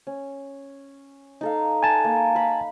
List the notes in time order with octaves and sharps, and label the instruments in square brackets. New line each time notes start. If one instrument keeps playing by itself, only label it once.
[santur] C#4
D#4 A4 F5
[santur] B4 [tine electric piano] G#5 A5
[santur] A#3
F5 B5